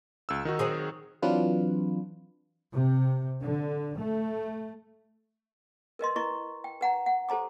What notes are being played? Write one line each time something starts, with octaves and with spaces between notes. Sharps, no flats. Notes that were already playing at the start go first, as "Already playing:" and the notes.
C#2 E6
D#3 D#4 F#4
F#3 C4 G#4
E3 F#3 C4 D4 F4 B4
C3
D3
A3
A#4 B4 D#5 C6
E4 B4 D#5 A#5 C#6
G5
B4 F#5 A#5
F#5
G4 A4 C5 A#5 D6